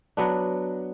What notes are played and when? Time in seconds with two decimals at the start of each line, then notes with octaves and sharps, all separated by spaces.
0.17 F#3 B3 D4